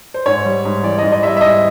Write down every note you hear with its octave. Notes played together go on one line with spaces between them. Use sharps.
C5
G#2 C#5
G3
G#2
E3 D5
D#5
G#2
D#5
G3 D#5 E5
E5
G#2 D#5